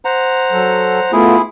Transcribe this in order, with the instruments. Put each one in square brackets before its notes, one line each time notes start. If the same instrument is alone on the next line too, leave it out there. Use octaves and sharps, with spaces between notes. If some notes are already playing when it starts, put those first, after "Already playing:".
[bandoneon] C5 F#5 A#5
[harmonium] F#3 A4
[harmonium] A3 B3 F4 [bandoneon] E4 G#4